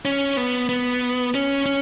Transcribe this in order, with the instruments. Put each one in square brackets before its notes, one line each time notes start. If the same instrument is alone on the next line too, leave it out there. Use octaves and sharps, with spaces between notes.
[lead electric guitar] C#4
B3
B3
C#4
C#4